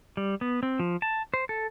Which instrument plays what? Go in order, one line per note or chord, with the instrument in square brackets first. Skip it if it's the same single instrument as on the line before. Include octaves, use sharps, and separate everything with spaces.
[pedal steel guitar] G3
B3
C4
F3
A5
C5
A4